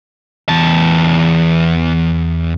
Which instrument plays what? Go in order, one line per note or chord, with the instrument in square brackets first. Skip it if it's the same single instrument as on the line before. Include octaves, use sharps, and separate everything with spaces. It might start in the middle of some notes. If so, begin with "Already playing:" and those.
[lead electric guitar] E2 A5